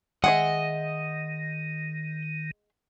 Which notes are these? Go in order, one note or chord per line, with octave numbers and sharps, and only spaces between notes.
D#3 G#3 G#4 D#5 E5 F#5